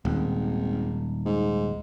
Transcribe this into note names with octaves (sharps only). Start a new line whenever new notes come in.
D#1 G#1
G#2